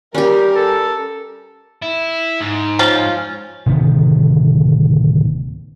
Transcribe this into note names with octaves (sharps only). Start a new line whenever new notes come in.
G3 C#4 G4 A#4
A4
E4
G#2
F3 C#4 F4
D1 C3 D#3 B3